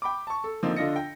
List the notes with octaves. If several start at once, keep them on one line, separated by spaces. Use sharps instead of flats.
G5 B5 D6
A5 C#6
A4
D3 F3 A#3 C4 D#4
D3 D4 F4 D#5 A#6 C#7
G5